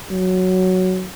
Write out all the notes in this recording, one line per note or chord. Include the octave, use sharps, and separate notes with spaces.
F#3